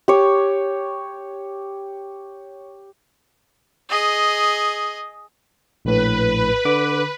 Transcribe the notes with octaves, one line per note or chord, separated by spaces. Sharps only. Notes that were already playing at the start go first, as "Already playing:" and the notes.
G4 C#5
G#4 D#5
A#1 A2 B4
D3 D6